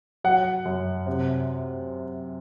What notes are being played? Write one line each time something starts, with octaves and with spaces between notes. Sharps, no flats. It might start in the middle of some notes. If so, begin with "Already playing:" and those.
F#3 F#5
F#2
C3